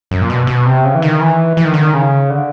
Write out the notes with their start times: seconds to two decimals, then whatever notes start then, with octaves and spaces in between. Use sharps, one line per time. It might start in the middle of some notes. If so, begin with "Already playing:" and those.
0.11 F#2
0.21 A#2
0.30 B2
0.47 B2
0.65 C3
0.85 C#3
0.95 E3
1.02 D#3
1.21 E3
1.57 E3
1.65 D#3
1.74 D3
1.81 D#3
1.94 C#3
2.30 D3